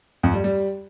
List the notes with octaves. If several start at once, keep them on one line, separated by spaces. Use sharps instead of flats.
F2
G3
G3